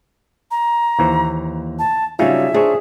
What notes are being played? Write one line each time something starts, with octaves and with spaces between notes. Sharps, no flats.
A#5
D#2 E3 C5
A5
C#3 F#3 G3 D#4 F4 G#4 E5
D4 G#4 C5 C#5